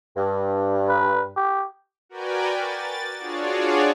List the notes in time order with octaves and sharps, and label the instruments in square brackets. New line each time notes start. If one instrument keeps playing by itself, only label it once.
[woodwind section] G2
[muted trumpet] B4
G4
[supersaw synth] F#4 A#4 B4 D5 G5 G#5
A6
D4 F4 F#4 G#4 C#5 D5